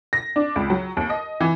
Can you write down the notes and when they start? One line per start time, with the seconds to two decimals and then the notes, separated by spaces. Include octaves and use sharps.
0.13 A#6
0.36 D4
0.56 C#2
0.70 F#3
0.97 D#2
1.10 D#5
1.41 E3